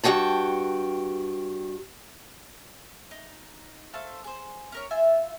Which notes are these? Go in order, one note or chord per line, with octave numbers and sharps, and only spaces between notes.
G2 G#3 F#4 G5 A5
D#4
A3 C5 F5 A5
G#4 C5
C#4 A#4 C#5
F4 E5 G#5